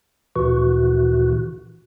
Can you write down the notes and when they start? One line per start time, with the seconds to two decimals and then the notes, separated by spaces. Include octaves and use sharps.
0.36 D2 A#2 E3 F#4